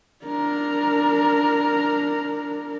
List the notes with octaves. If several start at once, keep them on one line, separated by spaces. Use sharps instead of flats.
D4 A#4